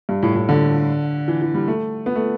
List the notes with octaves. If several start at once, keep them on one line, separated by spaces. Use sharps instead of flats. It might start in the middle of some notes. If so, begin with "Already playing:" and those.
G2
A2
A2
D3
E3
E3
G3
A3
B3
A3